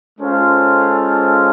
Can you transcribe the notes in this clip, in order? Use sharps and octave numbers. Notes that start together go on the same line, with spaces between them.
G#3 C#4 F4 A4 C5